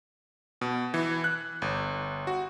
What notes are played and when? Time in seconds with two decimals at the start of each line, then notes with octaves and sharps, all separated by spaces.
0.61 B2
0.94 E3
1.24 F#6
1.62 G1
2.27 F#4